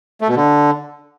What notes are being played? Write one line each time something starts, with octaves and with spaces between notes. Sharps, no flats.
A3
B2
D3